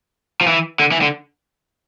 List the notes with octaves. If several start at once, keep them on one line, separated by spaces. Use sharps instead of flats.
F3
E3
D3
E3
D3